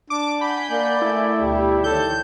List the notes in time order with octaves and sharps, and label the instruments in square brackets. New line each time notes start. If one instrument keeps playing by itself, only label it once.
[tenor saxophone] D4 [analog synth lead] D6
[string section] F#5 G#5 G6 [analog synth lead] B5
[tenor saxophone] A#3 [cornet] D5
[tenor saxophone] A3 [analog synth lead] E4
[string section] D2 B2 G3 [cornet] G4
[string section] D#3 C#5 [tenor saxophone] A4 [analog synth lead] G6